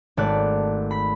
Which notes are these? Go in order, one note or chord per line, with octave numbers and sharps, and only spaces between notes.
G#1 A3 D5 F#6
B5 B6